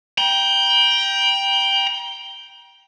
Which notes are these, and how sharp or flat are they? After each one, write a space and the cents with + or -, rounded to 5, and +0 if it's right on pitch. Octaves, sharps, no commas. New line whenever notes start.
G5 +0 A#5 +40